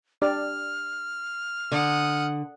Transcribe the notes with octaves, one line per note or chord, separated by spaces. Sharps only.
D4 G4 D5 F6
D3 F#5 D#6